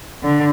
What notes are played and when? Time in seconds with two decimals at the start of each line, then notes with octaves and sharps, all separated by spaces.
0.24 D3